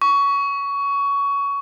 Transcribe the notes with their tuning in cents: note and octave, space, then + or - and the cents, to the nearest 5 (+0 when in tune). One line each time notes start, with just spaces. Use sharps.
C#6 +20